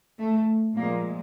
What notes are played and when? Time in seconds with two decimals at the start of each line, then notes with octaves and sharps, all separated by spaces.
0.19 A3
0.76 A#2 F3 G#3 A#3